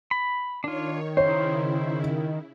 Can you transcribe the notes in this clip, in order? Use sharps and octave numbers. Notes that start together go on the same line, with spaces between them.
B5
D#3 D4 F4 C#5
C#3 E4 C5 C#5